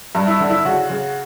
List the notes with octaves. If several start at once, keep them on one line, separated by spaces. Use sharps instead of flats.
G2
E4
D3
E4
C#3 F#4
C#3